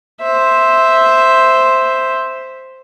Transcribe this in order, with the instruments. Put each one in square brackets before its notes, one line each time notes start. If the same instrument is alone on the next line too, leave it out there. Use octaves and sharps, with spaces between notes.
[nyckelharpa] C5 E5